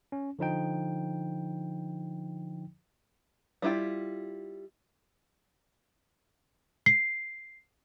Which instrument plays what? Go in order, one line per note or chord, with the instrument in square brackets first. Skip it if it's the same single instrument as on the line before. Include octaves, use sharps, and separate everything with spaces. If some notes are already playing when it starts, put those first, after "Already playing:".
[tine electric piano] C#4
D3 F3 D#4 G5
[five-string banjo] G3 G#3 E4 F4 G5
[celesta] C7